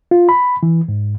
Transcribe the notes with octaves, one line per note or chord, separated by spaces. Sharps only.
F4
B5
E3
G#2